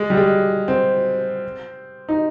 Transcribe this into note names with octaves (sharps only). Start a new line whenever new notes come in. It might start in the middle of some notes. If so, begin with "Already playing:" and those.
Already playing: G#3
G3
G#3
C4
D#4